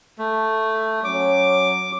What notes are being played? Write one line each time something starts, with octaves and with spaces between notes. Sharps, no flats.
A3
F#3 C#4 C#5 D6